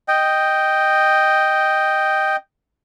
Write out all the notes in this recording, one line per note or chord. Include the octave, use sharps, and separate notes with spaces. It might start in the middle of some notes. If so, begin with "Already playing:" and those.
D#5 G5